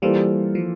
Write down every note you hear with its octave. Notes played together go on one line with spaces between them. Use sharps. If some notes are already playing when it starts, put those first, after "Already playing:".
E3 G3 A#3 F4 A4 C5
F3